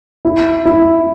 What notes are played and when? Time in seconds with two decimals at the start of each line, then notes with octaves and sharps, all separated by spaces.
0.25 E4
0.65 E4